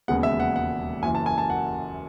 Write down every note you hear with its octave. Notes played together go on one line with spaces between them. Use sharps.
E1 D#2 C#3 G#3 B3 F#5
E5
F#5
F#5
F#1 F#2 E3 G#5
A5
G#5
A5
F#5